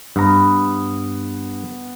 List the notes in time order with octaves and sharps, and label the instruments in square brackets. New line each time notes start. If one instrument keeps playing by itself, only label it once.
[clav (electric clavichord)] G2 A#5 [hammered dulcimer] B3